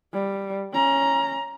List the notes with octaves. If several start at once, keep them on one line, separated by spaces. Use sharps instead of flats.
G3
C#4 A#5